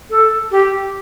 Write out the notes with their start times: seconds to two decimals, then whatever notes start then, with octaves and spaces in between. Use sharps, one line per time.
0.10 A4
0.51 G4